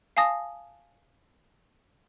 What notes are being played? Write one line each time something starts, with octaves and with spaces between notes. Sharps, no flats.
F5 G#5 A5 D#6 A#6